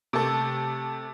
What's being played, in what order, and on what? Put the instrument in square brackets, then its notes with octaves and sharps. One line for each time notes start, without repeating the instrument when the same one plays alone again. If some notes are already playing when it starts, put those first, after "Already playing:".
[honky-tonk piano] C3 A3 A4